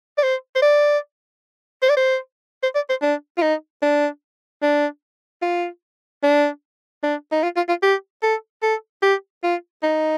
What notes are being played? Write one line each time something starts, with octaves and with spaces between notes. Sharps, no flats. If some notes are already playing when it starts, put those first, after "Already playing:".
D5
C5
C5
D5
C5
D5
C5
C5
D5
C5
D4
F4
D#4
D4
D4
F4
D4
D4
D#4
F4
F4
F4
G4
A4
A4
G4
F4
D#4